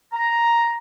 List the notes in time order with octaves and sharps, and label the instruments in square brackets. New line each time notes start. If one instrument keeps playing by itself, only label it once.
[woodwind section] A#5